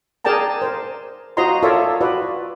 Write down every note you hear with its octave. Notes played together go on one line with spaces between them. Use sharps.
G#4 A#4 D5 G5 A5 A#5
A#4 C5
F4 F#4 C5 D#5 A#5 C6
F4 A4 A#4 C#5 D5 E5
F4 F#4 B4 D5